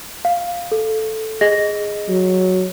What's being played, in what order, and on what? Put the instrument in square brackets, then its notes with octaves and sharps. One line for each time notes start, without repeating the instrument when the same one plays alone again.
[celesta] F5
A4
G#4 D#5 A#6
[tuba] F#3